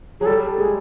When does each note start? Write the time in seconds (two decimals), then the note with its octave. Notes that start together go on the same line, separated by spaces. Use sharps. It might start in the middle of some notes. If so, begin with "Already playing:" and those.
0.21 F#3 G#4
0.26 G3 A4
0.58 G#3 G#4